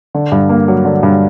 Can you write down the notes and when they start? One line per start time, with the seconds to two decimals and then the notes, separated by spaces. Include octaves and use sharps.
0.14 D3
0.32 G2
0.49 A#3
0.68 F#3
0.85 D3
1.03 G2